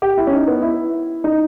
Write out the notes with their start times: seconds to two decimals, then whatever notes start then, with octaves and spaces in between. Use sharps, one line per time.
0.02 G4
0.17 E4
0.27 C#4
0.33 D#4
0.47 B3
0.62 E4
1.24 D#4